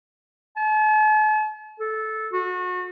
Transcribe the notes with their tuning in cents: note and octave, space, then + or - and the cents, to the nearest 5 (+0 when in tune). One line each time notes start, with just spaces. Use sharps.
A5 -45
A4 -15
F#4 -30